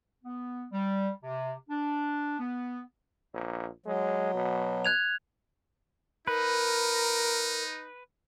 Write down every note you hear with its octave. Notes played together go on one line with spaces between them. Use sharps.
B3
G3
C3
D4
B3
A#1
F#3 G#3
B2
F#6 G#6 F7
D#4 A#4 B4